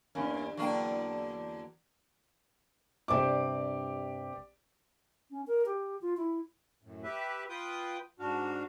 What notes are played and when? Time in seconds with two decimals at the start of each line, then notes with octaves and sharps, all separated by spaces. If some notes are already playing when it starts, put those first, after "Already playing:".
0.15 E2 G2 A#3 C#4
0.57 E2 D3 F#3 A#3 D4 G5
3.08 G2 C3 G4 D5 D6
5.31 C#4
5.47 A#4
5.66 G4
6.01 F4
6.17 E4
6.82 F#2 A2
7.03 G4 B4 E5
7.49 F4 B4 G5 D#6
8.19 G#2 D4 F#4 F5